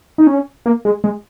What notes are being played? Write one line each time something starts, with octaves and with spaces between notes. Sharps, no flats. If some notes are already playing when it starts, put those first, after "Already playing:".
D#4
C#4
A#3
G#3
G#3